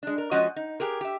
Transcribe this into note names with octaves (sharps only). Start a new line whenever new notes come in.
G#3 D4
A#4
F3 G#3 C#4 F#4 D#5
D#4
G4 G#4 A#4
G4 E5